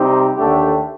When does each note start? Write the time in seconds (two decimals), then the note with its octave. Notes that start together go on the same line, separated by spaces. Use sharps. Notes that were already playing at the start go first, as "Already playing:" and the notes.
Already playing: C3 G3 C4 D#4 G4
0.37 D#2 D3 A3 D4 G4